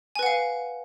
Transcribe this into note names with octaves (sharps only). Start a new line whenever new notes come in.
B4 F5 F#5 G#5